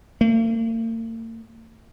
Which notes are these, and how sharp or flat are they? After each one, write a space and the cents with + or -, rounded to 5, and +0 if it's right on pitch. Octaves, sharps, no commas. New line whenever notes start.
A#3 -45